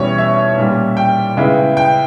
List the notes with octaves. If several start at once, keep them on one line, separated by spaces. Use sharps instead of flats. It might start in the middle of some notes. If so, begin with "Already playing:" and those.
Already playing: E2 B2 G3 C#4 E4 C#5
E5
A#2 G3 C#4
G5
C#3 G#3 B3 E4
G5